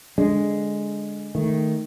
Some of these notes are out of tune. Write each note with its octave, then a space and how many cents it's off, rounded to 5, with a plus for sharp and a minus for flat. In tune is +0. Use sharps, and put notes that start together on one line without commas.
D3 -15 G#3 +0 D4 -10
D#3 +0 A3 +0